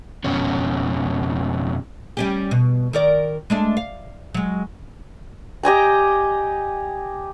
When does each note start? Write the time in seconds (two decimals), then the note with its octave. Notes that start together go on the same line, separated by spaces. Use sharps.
0.24 F2 B2 C#4
2.17 G3 C#4 G4
2.51 B2
2.93 D#3 A#4 D5
3.50 G#3 A3 D4
3.77 F5
4.35 F#3 G#3
5.63 G4 D#5 G#5 A#5